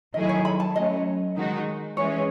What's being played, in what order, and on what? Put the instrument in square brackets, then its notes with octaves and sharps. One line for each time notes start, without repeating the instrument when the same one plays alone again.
[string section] D#3 F#3 A3 E4 G#4 [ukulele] D#5
[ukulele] C#5
B5
A5
[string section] F#3 A3 C#4 [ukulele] D#5
[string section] D#3 G#3 D#4 F#4
[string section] E3 G#3 C#4 [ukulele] C#5